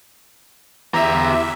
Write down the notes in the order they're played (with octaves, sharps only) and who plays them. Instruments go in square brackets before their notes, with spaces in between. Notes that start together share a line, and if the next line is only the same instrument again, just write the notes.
[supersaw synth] E2 E5 [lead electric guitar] G4 A#5